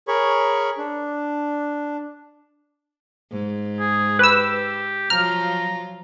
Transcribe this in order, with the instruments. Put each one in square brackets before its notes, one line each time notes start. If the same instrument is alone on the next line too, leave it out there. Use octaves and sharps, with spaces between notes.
[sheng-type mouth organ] G#4 A#4 C#5 B5 C#6
D4
[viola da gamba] G#2
[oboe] G#4
[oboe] G4 [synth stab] B4 E6
[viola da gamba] F3 F#3 F4 [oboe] A#5 [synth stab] F6